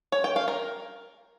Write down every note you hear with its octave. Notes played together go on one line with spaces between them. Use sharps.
C#5
G5
F5
A#4